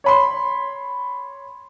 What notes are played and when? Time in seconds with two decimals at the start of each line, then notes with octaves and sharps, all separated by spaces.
0.04 C#5 B5 C6